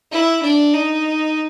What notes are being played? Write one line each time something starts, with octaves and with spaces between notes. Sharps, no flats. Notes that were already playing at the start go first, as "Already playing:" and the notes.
E4
D4
D#4